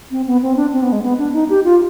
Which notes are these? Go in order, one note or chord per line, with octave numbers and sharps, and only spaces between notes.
C4
B3
C4
D4
C4
B3
G#3
B3
D4
D#4
G4
F4